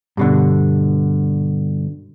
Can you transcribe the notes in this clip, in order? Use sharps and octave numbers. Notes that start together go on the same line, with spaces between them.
G2 B2 D3